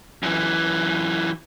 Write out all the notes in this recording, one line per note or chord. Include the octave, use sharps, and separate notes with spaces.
F#2 E3